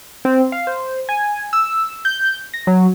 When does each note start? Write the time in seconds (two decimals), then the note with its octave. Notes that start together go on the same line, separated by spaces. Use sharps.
0.25 C4
0.52 F5
0.67 C5
1.09 G#5
1.53 E6
2.05 G6
2.54 A#6
2.67 F#3